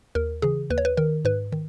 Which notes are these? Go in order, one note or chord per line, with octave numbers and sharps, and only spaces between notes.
D#2 A#4
C#3 E3 G#4
D#2 B4
C#5
B4
D#3 A#4
G#2 B4
D#3